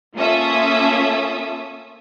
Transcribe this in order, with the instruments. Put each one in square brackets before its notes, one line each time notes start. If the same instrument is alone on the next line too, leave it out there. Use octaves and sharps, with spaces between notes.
[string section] A#3 C#4 F4 A4 E5 D#6